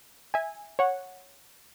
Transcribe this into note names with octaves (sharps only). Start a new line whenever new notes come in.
E5 G#5
C#5 F#5